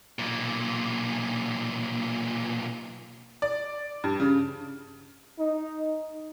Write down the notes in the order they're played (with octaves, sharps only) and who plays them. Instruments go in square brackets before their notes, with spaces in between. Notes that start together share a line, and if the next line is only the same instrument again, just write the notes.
[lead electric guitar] B1 A#2
[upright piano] D5
G2
C#3
[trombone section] D#4